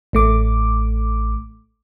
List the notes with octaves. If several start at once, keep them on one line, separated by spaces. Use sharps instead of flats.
A1 A3 D6